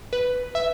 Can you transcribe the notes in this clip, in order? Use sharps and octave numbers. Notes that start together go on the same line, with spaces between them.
B4
E5